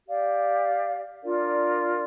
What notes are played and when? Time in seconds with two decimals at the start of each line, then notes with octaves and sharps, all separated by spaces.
0.07 G4 D5 F5
1.22 D4 F4 A#4 D5